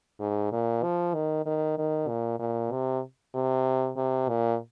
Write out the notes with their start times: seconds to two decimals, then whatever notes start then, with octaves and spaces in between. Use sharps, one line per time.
0.20 G#2
0.52 A#2
0.83 F3
1.14 D#3
1.46 D#3
1.78 D#3
2.08 A#2
2.40 A#2
2.71 C3
3.35 C3
3.97 C3
4.29 A#2